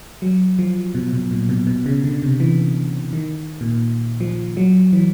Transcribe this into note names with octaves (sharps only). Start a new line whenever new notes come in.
F#3
F3
B2
B2
A#2
B2
B2
C#3
D3
C3
E3
D#3
A#2
F3
F#3
E3